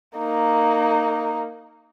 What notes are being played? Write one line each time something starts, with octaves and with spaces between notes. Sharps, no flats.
A#3 D#4